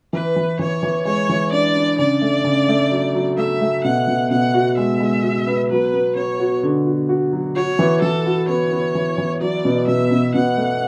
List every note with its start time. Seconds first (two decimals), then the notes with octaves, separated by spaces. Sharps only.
0.13 E3 B4
0.36 E3
0.59 E3 C#5
0.83 E3
1.05 G#3 C#5
1.29 E3
1.52 D4 D5
1.75 D4
1.98 C#3 D5
2.22 A3
2.44 C#3
2.69 A3
2.91 F#3
3.14 F#3
3.37 A3 E5
3.61 A3
3.84 B2 F#5
4.08 B2
4.31 B2 F#5
4.54 F#4
4.77 G#3 E5
5.00 G#3
5.23 F#4
5.47 B3
5.70 F#3 B4
5.94 B3
6.16 B3 C#5
6.40 F#4
6.63 D3
6.87 F#4
7.09 F#4
7.33 F#3
7.55 F#4 C#5
7.79 E3
8.02 E3 A4
8.26 F#4
8.48 B3 C#5
8.72 B3
8.95 E3
9.18 E3
9.41 F#3 D5
9.65 B2
9.87 B2 E5
10.11 B2
10.34 B2 F#5
10.57 A3